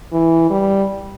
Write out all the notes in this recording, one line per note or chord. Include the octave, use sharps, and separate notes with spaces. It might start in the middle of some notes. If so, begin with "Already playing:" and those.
E3
G3